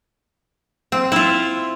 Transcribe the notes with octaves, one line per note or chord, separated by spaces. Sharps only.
C4
E4 F4